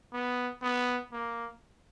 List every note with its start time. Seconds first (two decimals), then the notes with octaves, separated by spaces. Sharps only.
0.13 B3
0.63 B3
1.12 A#3